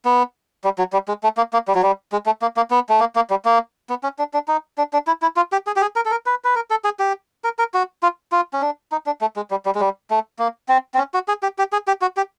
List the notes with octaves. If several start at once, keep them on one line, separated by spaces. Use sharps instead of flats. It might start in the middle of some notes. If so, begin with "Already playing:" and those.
B3
G3
F#3
G3
G#3
A3
A#3
A#3
G3
F#3
G3
G#3
A3
A#3
A#3
B3
A3
A#3
A#3
G3
A#3
B3
C#4
D4
D4
D#4
D4
D4
E4
E4
F4
G4
G#4
G4
G#4
A#4
A4
A#4
B4
B4
A#4
A4
G#4
G4
A#4
A#4
F#4
F4
F4
C#4
D4
D#4
D4
A3
G#3
G3
G3
G#3
G3
A3
A#3
C4
C4
C#4
F#4
G#4
G4
G4
G#4
G4
F#4
G4